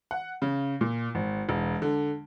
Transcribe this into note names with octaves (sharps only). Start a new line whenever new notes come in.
F#5
C#3
A#2
G#1
E1
D3